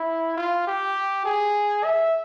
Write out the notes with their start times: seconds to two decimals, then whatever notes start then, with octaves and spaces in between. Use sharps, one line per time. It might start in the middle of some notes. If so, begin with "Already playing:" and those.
Already playing: E4
0.37 F4
0.67 G4
1.25 G#4
1.84 E5